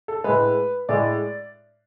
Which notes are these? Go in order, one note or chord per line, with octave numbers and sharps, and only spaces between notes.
A4
A2 G#3 B4
A2 G#3 D5